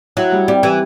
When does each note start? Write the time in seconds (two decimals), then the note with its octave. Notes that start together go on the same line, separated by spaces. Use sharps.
0.17 F#3 E4
0.32 G3
0.48 G3 C4
0.63 E3 G4